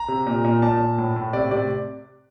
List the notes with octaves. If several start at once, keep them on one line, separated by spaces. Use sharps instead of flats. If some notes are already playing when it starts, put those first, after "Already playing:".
Already playing: A#5
C3
A#2
A#2
A#2 A5
A#2
A2
A2
C3 D5
C3 D5